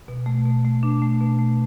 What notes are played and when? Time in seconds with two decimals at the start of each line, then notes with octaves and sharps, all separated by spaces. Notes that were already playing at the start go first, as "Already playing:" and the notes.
0.08 B2
0.26 A3
0.46 B2
0.65 A3
0.83 B2 D4
1.02 A3
1.21 B2
1.39 A3